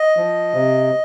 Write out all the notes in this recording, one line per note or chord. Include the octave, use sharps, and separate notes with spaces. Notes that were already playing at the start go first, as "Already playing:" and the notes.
Already playing: D#5
F3
C3